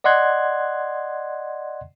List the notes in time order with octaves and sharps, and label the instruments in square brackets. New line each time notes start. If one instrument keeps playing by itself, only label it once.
[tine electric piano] D5 D#5 F#5 C6 F#6 G#6